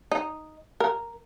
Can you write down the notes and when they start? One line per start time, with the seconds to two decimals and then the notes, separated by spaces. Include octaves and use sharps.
0.11 D#4
0.80 A#4